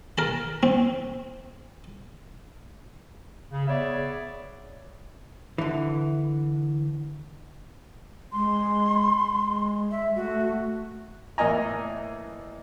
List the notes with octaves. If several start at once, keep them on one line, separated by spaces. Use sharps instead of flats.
A#4 A5
C4
C#3
B3 G#4 C#5 D5 E5
D3 E3
G#3 C6
G#3
E5
A3 F#4
E2 A2 A#3 D#5 G#5 A#5